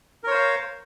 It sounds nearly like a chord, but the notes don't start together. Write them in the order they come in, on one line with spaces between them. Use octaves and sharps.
A#4 C#5 C5 F5